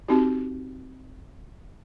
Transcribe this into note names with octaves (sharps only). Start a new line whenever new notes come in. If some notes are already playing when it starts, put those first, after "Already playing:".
C4 D#4 F#4 G4